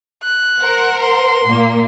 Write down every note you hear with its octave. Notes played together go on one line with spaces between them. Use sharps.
F#6
A#4 C5 F#5
C6
A#2 A#3